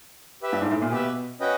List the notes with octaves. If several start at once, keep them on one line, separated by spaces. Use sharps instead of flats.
G4 B4 E5
G2
G#2
A2
A#2
B2 G4 B4 E5
C#4 F#4 B4 D#5 G5